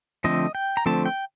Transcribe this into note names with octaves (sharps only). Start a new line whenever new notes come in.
D3 F3 A3 C4 D#5
G5
A#5
D3 F3 A3 C4 A5
G5